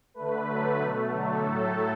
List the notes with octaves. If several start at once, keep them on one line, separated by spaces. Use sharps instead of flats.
D3 A3 B4
D3 F#3 A3
B2 A3
D3 F#3 A3 A4
A2 F#3 A3